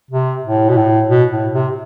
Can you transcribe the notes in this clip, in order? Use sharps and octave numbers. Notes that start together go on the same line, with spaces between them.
C3
A2
B2
A2
B2
A2
C3